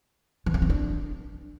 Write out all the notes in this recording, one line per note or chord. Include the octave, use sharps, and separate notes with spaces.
E3
C#4
C4
D4